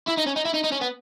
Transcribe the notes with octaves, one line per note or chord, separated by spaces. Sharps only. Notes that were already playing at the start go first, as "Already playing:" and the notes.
E4
D#4
C#4
D#4
E4
D#4
D#4
C#4
B3